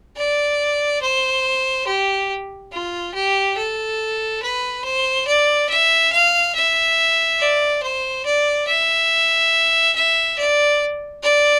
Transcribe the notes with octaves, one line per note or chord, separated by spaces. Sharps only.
D5
C5
G4
F4
G4
A4
B4
C5
D5
E5
F5
E5
D5
C5
D5
E5
E5
D5
D5